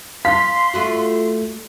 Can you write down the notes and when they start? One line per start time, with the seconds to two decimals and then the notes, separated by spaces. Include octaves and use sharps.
0.25 F5 C6 B6
0.74 A3 F4 F#4